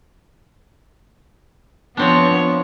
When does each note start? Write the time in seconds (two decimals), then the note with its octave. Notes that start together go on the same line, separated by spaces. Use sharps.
1.97 F3 B3 C4 D4 C#5